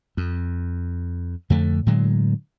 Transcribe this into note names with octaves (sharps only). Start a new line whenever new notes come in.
F2
F2 D3 A3
A2 D3 F#3 G#3